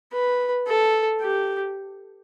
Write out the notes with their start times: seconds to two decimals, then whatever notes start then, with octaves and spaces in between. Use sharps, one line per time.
0.13 B4
0.67 A4
1.21 G4